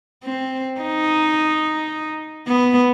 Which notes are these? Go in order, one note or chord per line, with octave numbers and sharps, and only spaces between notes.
C4
D#4
B3